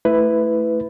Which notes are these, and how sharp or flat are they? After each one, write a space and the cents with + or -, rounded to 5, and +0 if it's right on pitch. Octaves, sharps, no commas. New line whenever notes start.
A3 +0 E4 +0 B4 +10